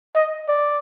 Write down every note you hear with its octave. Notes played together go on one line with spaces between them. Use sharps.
D#5
D5